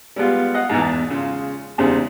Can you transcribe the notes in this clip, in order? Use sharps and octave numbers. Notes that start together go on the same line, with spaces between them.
G3 G#3 B3 F4
D#5 F5 F#5
G#2 B2 E3
E2
C#3 G#3 F4
E2 C#3 G3 G#3 C4 D#4